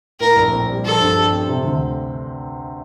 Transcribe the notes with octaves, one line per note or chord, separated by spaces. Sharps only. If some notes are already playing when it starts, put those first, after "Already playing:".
A2 A#4
A#1
C4
G3
F3 A4
G2
G4
C4
C3
D2